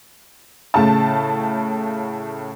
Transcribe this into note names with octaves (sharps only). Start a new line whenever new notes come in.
A2 C#3 A5